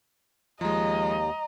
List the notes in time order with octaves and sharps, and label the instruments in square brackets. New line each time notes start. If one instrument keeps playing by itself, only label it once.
[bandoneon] D#2 [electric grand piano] F3 G#3 [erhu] D#5 [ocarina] A#5